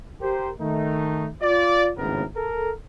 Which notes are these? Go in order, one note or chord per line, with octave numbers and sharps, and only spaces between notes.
G4 A#4 C5
D#3 A3 D#4
F4 D5
G#1 D#2 A2 C#3 B3 A#4
A4 A#4